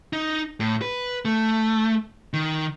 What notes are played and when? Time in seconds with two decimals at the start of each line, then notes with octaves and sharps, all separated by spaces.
0.13 D#4
0.60 A2
0.82 B4
1.25 A3
2.34 D#3